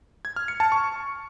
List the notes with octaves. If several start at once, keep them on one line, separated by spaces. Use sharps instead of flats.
G#6
F6
C#7
A5
C#6